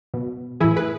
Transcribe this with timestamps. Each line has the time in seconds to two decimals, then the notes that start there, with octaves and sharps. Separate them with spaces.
0.14 B2
0.60 E3 E4 G#4
0.64 A2
0.76 G#4 B4